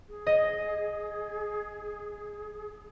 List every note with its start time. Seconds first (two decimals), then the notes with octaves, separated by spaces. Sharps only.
0.08 G#4
0.27 D#5